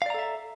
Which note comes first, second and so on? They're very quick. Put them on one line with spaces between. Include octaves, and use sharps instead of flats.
F5 D5 A#5 A4 E5